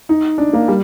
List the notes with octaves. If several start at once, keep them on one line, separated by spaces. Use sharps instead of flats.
D#4
D4
A#3
G3